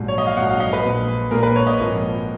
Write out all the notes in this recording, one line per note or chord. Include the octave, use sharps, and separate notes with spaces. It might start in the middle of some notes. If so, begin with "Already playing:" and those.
Already playing: A#1 G#2 F#3
C#5
D#5
F5
A#1 G#2 F#3 F#5
F5
D#5
B4
A#1 A#2 G#3
A#1 A#2 G#3 A#4
B4
C#5
D#5
G#1 G#2 F3 A#3